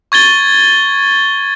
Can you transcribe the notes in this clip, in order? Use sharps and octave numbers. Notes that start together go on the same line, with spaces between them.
C#6 G#6 A6 G7